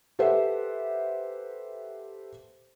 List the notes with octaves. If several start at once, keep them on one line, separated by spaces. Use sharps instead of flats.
G4 A4 B4 C5 E5 F#5